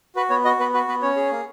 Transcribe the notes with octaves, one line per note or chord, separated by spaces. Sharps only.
F#4 B4
B3 C#5
F#4 D#5
B3 B4
F#4 B4
B3 B4
C#4 C#5
G#4
A#3